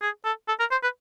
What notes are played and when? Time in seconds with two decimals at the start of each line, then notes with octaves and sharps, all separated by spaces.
0.02 G#4
0.25 A4
0.48 A4
0.60 A#4
0.71 C5
0.83 B4